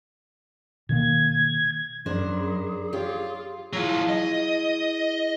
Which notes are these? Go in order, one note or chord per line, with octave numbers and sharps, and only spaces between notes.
B2 D#3 A#3 G#6
F#2 D4 G#4 A#4 C5
F4 G4 C#5 G5
F#3 E4 F4 G#4
D#5